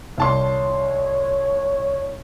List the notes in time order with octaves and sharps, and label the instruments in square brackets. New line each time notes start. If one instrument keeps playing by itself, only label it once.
[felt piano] C2 A5 C6 [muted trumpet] C#5